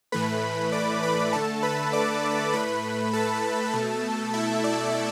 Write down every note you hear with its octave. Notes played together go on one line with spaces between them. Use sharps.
A2 E3 A3 B4 B5
D5 D6
B4 B5
D3 A3 A4 A5
B4 B5
D5 D6
A2 A3 B4 B5
A4 A5
B2 A3
E4 E5
D5